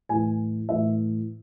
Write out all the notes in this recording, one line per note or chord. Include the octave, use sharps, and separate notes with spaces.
A2 E3 G#5
A2 E3 E5